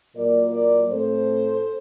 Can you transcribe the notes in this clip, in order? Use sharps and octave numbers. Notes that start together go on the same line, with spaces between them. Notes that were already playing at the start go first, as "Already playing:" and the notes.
A#2 F#3 A#3 A#4 D5
A#4 D5
A2 A3 C4 A4 C5